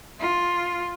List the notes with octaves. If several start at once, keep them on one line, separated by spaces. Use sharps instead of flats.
F4